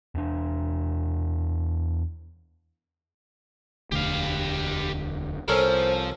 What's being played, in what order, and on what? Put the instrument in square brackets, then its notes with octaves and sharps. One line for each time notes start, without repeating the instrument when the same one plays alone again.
[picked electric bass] E2 D4
[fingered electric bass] E1 D2 D3 [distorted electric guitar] G4 F5
[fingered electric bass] C2 [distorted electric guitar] F3 [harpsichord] C#4 A4 A#4 [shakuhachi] C5